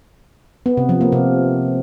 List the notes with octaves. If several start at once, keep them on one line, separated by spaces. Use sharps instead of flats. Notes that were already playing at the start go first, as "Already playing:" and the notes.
B3
C3
F3
A#3
C3